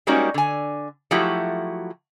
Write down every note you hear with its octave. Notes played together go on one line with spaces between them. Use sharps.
G3 G#3 A#3 C#4 D#4 F#4
D3 G#5
F3 F#3 A3 E4 F#4 G4